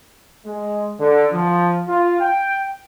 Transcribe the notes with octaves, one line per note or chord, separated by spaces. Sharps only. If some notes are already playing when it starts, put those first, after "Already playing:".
G#3
D3
F3
F4
G5